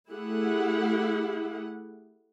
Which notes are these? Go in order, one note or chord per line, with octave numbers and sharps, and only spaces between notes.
A3 E4 G4 G#4 F#5